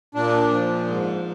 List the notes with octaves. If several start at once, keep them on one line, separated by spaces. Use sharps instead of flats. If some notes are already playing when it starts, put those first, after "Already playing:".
A#2 D4
F3
G#2